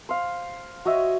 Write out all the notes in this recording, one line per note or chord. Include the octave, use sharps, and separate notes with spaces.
C5 F5
F#4 C#5 D#5 E5